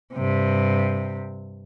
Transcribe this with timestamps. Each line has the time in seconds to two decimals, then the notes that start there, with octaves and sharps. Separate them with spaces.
0.14 G2 C3